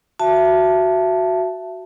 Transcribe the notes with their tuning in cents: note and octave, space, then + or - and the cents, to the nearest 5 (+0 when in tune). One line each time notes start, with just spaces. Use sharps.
F#4 +0 E5 +25 A5 +0